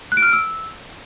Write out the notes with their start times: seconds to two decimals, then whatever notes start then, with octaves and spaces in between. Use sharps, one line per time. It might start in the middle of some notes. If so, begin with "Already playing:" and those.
0.12 F#6
0.17 D7
0.22 F6
0.28 D7
0.33 E6